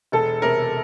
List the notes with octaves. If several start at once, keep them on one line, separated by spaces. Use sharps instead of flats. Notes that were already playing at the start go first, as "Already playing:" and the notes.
E1 A4
C3 A#4